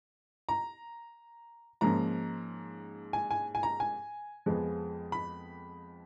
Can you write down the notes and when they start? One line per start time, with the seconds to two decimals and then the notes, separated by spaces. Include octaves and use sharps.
0.49 A#5
1.81 G#2 F3 A#3 C#4 A#5
3.13 G#5
3.31 G#5
3.55 G#5
3.63 A#5
3.80 G#5
4.46 F2 F3 G#3 B3
5.12 B5